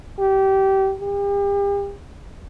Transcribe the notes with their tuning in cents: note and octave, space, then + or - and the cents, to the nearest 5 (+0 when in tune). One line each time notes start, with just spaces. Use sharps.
G4 -25
G4 +40